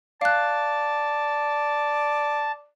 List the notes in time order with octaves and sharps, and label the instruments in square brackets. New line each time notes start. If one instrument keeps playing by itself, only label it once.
[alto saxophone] D5 [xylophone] F5 F#6 [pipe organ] A5